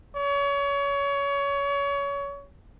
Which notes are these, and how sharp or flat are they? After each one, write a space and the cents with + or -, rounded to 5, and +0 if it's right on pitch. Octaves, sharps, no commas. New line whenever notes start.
C#5 +30